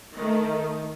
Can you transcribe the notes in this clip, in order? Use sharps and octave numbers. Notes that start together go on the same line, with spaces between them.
D#3 A3